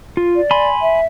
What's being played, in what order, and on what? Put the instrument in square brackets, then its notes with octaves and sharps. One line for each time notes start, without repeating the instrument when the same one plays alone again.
[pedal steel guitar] F4
[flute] D5
[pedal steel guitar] G#5 B5 C6
[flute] E5